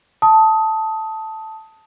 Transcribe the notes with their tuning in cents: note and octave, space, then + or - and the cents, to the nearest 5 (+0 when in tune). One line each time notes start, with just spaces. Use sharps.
A5 +0 D#6 +20